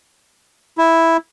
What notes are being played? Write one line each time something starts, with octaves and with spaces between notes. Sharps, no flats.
E4